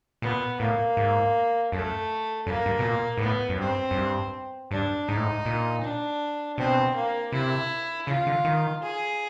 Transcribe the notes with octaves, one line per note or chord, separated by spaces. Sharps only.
A#2 B3
A2 A#3
G#2
F#2 A3
F#2 A#3
G2
B2
A#2
G#2
A2 B3
F#2
G2 C4
F#2
G2
G2 D4
G#2 D#4
A2
G#2
A#2
D4
B2 C4
A#3
C3 E4
C#3 F4
D3
D#3
G#4